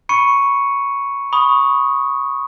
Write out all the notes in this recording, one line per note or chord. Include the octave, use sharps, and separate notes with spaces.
B5 C#6 C#7 D#7
B5 C#6 D#6